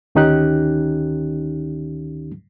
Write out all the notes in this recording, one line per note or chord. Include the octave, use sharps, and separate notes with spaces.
D2 D#3 C#4 D#4 G4 F#6